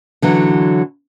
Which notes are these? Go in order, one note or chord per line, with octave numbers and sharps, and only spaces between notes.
D3 E3 F#3 C#4